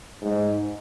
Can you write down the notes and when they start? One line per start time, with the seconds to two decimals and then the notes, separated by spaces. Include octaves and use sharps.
0.22 G#2